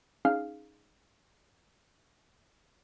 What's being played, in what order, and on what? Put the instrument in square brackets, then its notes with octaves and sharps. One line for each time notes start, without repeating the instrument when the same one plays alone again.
[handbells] C#4 D#4 G#4 F5 F6